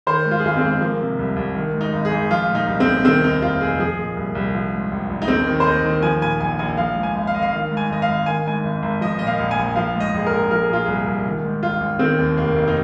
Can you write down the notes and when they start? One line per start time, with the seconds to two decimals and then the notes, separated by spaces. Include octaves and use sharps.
0.07 D#3 C5
0.26 G#2
0.31 F4
0.39 G#4
0.44 G#1 F4
0.57 C4
0.62 G#1
0.81 F3 A#3
1.00 C3
1.19 C2
1.36 C2
1.55 D#3
1.74 G#2
1.81 D#4
1.93 G#1
2.05 G#4
2.11 G#1
2.31 F3 F4
2.49 A#2
2.55 D#4
2.67 C2
2.80 C4
2.85 C2
3.04 D#3 C4
3.24 D#2 D#4
3.41 F1 F4
3.61 F1 G#4
3.79 F3 G#4
3.97 A#2
4.17 C2
4.35 C2
4.54 F3
4.73 G#2
4.91 A#1
5.10 A#1
5.22 D#4
5.28 D#2 C4
5.47 D#3
5.60 C5
5.66 D#2 D#5
5.85 D#3
6.03 F3 G#5
6.22 A#2 G#5
6.41 A#1 G#5
6.59 A#1 G#5
6.77 F3 F5
6.96 G#2
7.03 G#5
7.15 G#1
7.27 F5
7.34 G#1 D#5
7.42 F5
7.53 D#3 F5
7.71 G#2
7.77 G#5
7.90 G#1 D#5
8.02 F5
8.08 G#1
8.26 D#3 G#5
8.46 G#2 G#5
8.64 G#1
8.83 G#1
9.01 F3 D#5
9.19 A#2 D#5
9.27 F5
9.39 A#1
9.51 G#5
9.58 A#1
9.76 F3 F5
9.94 G#2
10.00 D#5
10.14 A#1 G#4
10.26 A#4
10.31 A#1
10.51 F3 A#4
10.62 G#4
10.69 A#2 F4
10.84 C2 G#4
11.07 C2
11.26 D#3
11.44 G#2
11.63 A#1 F4
11.81 A#1
11.99 D#3 C4
12.18 D#2
12.37 F1 A#3
12.56 F1
12.68 D#4